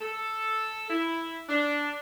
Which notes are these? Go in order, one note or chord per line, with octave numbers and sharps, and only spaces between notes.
A4
E4
D4